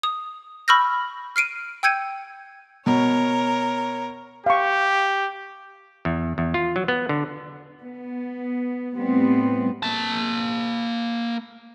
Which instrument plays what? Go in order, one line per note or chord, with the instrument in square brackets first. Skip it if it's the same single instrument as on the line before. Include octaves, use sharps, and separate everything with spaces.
[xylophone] D#6
B5 C#6 E6 F6 G6 A#6
F6 C7 D7 D#7
G5 E6 G6 G#6 C#7 D#7
[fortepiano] B2 [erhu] A#4 [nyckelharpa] C#5
[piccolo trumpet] G4 [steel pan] F5 C#6
[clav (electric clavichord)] E2
E2
F4
F#3
B3
D3
[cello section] B3
A2 G3 B3 C4
[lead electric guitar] A#3 A5